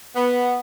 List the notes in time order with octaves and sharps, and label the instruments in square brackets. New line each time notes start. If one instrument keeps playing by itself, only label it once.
[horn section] B3